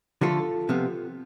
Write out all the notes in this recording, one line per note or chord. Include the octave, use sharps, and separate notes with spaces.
D3 F3 A3 F4 A4
C3 F3 B3